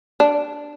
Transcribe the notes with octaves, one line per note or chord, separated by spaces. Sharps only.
D4